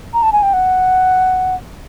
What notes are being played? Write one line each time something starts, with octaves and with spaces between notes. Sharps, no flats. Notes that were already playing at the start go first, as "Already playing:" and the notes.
A#5
A5
G#5
G5
F#5